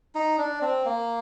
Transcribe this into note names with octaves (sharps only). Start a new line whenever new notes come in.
D#4
D4
C4
A#3